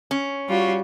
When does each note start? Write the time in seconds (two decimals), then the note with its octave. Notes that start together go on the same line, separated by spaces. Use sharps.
0.11 C#4
0.49 G3 F4 F#4